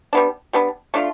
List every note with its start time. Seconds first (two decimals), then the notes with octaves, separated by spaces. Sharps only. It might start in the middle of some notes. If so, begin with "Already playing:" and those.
0.13 G3 B3 D4
0.53 G3 B3 D4
0.94 A3 D4 F4